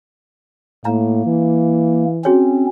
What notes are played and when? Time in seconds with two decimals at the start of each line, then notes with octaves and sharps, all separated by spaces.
0.85 A2 A#3 A#5
1.26 E3
2.25 C4 C#4 F#4 G#4 C#5